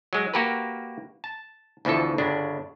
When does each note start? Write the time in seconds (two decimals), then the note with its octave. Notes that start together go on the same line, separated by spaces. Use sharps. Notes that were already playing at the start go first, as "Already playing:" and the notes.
0.13 F#3 G#3
0.34 A#3 F#4 G4 A#4 B4
1.24 A5
1.85 D2 B2 E3 F3 A4
2.18 G1 C#3 D4